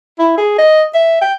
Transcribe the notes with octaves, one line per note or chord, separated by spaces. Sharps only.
E4
G#4
D#5
E5
G5